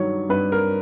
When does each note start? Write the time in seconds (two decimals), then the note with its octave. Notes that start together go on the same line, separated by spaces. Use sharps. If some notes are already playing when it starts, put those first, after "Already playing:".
Already playing: G2 D#3 F#3 C#5
0.29 G2 B4
0.52 A#4